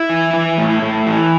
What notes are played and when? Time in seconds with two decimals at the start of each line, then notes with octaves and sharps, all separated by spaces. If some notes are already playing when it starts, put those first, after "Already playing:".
Already playing: E4
0.09 E3
0.33 E3
0.58 A2
0.82 A2
1.07 E3